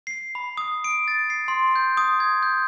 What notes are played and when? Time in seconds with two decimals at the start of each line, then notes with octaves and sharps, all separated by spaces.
0.07 C7
0.35 B5
0.57 D#6
0.84 D7
1.08 A6
1.30 C7
1.48 C6
1.76 G6
1.97 D#6
2.20 G#6
2.43 G6